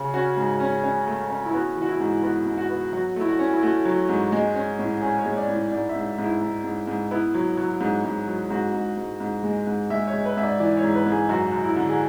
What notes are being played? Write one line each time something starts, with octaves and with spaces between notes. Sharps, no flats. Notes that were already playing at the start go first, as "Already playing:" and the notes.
Already playing: C#3
C#4 F#4
G#2
C#4
C#4
A3
C#4
E4
B3 F#4
E3
F#4
E4
G#2
B3 F#4
G#2
F#4
B3
F#3 F#4
A3 E4
F#4
C#4
E4
A3 F#4
F#3
G#2
G#3
C#4
A2
C#4 G#4
C#5
G#3
D5
A2
G#2 D5
E5
G#2
G#2
E4
G#2
G#2
G#2
B3 E4
F#3
F#3
G#2
G#2
F#3
G#2 F#4
G#2
G#2
G#2
G#3
G#2
G#3 E5
C#5
G#3
B4
G#2 E5
D5
E3 D5
C#5
G#2
B4
G#2
G#4
F#2 F#4
F#2
E4
D3
G#4